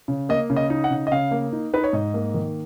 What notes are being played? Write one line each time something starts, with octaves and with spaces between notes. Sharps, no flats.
C#3
A#3 D#5
C#3
D#5
D#4
F#5
C#3
D#5
C#3 F5
A#3
D#4
D#4 B4
C#5
G#2 D#5
A#3
D#3